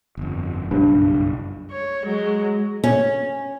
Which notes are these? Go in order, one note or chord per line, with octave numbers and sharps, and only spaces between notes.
G1 F2
F#1 B1 G2
C#5
F#3 G#3
C#4